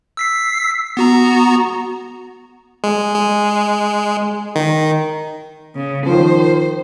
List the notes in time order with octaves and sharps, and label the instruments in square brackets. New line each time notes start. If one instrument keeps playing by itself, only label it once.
[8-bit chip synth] E6 B6 C7
B3 F#4 A#5
G#3
G#3
D#3
[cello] C#3
[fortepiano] D#3 F3 [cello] C5